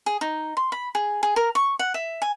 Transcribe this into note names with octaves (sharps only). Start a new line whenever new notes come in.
G#4
D#4
C6
B5
G#4
G#4
A#4
C#6
F#5
E5
G#5